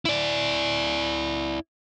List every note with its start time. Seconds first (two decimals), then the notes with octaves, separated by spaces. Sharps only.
0.05 E4 D5